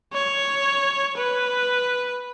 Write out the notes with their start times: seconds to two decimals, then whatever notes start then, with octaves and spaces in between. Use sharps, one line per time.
0.13 C#5
1.17 B4